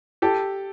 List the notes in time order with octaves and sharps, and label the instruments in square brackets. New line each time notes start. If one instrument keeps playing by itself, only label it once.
[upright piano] G4 A4